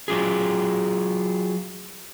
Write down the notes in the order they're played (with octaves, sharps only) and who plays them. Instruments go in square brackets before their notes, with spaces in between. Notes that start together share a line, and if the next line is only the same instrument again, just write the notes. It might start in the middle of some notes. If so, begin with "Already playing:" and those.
[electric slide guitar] F#3 F4 G#4